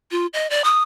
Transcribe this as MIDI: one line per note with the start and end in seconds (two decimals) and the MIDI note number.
0.11 0.26 65
0.34 0.50 75
0.50 0.62 74
0.64 0.83 87